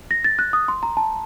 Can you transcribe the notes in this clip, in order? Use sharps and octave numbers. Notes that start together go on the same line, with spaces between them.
A#6
A6
F#6
D#6
C6
A#5
A5